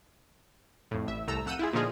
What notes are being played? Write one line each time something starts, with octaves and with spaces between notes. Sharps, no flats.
F2 A2
A1 E5
C2 A3 A#5 E6
F2 F#5 E6 G6 D#7
E4 F4 G#4
A#2 D3 F3 D#4 F4 G#4